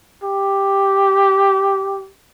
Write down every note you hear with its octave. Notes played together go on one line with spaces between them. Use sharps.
G4